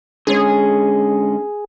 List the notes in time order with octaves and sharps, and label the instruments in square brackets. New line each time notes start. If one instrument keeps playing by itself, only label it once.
[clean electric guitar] D3 G#3 C#4 [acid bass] G#4